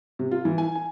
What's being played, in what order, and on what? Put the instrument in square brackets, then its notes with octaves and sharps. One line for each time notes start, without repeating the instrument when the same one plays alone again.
[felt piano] C3
F4
E3
G#5
G#5